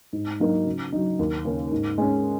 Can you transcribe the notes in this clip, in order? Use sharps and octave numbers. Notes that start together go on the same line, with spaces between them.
G#2
F#3 A#3 D#4 F#4
C#3
F#3 D#4
D#2
C#3 A#3 C#4
G#2
G#3 C#4